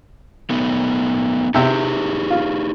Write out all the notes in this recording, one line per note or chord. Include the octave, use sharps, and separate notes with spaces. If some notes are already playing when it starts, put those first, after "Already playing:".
A3 B3 D#4
C3 D#4 G4 G#4 E5 G5
F4